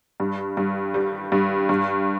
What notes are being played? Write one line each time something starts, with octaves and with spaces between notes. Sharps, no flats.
G2
G2
G3
G2
G2